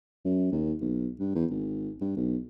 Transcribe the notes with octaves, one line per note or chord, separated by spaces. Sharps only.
F#2
D#2
B1
G2
E2
G#1
G2
B1